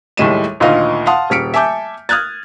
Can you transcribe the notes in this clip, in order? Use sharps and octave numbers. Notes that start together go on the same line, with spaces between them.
D#2 A2 G3 G#3 D#7 E7
D2 A#2 D#3 A#3 D#5 F5
F5 F#5 A5 C6 D#6
D#1 C#3 F6 B6 C#7 D7
E5 G#5 A5 D6 G6
D#6 F6 F#6 G#6 A6